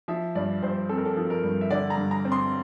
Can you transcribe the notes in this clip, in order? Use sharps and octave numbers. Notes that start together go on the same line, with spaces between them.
F3 E5
G2 D5
G2 C5
C4 A4
A#4
A4
F3
A#4
G2
E5
D3 D5
A#5
G2
A#5
C4
C6